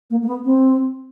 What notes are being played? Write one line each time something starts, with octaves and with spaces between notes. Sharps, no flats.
A#3
A#3
B3
C4